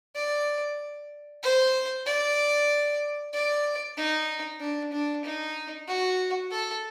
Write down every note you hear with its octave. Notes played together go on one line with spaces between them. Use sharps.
D5
C5
D5
D5
D#4
D4
D4
D#4
F#4
A4